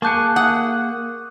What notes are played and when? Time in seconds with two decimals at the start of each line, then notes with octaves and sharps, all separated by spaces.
0.02 A#3 G#4 A5 C#6 D6 F#6 G6 C#7
0.36 F#5 D#6